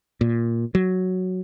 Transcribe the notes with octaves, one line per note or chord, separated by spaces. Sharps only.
A#2
F#3